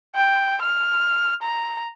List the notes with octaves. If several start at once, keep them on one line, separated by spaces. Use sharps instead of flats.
G5
F6
A#5